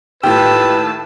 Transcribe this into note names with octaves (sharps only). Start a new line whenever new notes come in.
D#2 A2 F4 G4 B4 A5 E6